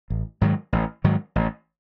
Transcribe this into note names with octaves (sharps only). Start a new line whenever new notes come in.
A1
G#2 D#3 F#3
A1
G#2 D#3 F#3
A1